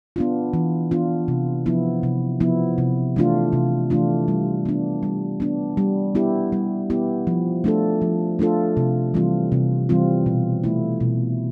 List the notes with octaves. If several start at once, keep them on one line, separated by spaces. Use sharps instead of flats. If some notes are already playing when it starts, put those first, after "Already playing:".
B3 D4 F4
E3
B3 D4 F4
C3
F3 B3 E4
C3
F3 B3 E4
C3
E3 A3 D4 F4
C3
E3 A3 D4 F4
G3
B3 D4
G3
B3 D4
G3
B3 E4 G4
G3
B3 E4 G4
F3
A3 D4 F4 A4
F3
A3 D4 F4 A4
C3
E3 G3 C4 F4
C3
E3 G3 C4 F4
B2
A3 E4
B2